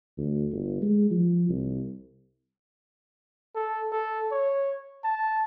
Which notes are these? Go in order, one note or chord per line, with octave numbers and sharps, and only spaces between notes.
D2
G1
G#3
F3
C2
A4
A4
C#5
A5